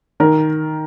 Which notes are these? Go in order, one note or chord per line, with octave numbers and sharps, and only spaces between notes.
D#3 A#4